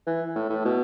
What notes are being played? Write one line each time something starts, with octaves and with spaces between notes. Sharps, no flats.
E3
A2
A2
B2